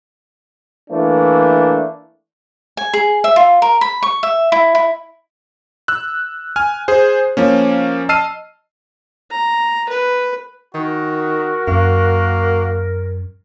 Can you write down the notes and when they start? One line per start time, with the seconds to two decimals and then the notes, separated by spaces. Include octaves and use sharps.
0.91 E3 A3 A#3 D4
2.77 G#5
2.93 G#4
3.24 E5
3.36 F4
3.62 A#4
3.81 B5
4.02 C#6
4.23 E5
4.52 E4
4.75 E4
5.88 E6 F#6
6.56 G#5 F6
6.88 G#4 C5
7.37 F3 A#3 C#4
8.09 D#5 A5 E6 F6 C7 D#7
9.31 A#5
9.89 B4
10.74 D#3 F#4 A#4
11.68 F#2 A#3